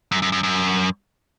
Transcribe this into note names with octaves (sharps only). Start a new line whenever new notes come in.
F#2
F#2
F#2
F#2